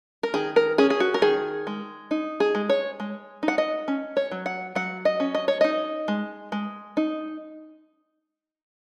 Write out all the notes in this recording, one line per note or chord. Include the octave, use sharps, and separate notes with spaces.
A#4
D#3 G#4
A#4
C#4 G#4
G#4
F#4
A#4
D#3 G#4
G#3
D#4
G#4
G#3
C#5
G#3
D#4
F#5
D#5
C#4
C#5
F#3
F#5
F#3 F#5
D#5
C#4
D#5
C#5
D#4 D#5
G#3
G#3
D#4